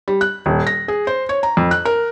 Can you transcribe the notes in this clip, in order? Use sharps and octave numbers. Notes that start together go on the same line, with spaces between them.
G3
F#6
D#1
A#6
G#4
C5
C#5
A#5
F2
F#6
A#4